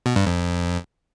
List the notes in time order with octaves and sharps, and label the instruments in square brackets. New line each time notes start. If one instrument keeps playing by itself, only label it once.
[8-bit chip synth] B2
G2
F2